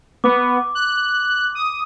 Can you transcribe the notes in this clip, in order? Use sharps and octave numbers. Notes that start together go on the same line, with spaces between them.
B3 D6
F#6
D#6